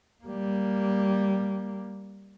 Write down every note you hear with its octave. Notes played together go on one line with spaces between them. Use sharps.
G3 A#3